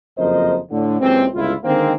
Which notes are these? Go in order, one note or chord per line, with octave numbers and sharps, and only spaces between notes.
F#1 F2 F3 A#4 C5 D#5
A2 D3
F#1 C#2 C3 E3 C4
G1 C#2 E4 F4
D3 D#3 G#3 A#3 C4